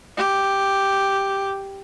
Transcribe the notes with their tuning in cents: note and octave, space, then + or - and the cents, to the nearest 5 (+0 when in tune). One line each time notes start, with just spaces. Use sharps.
G4 +0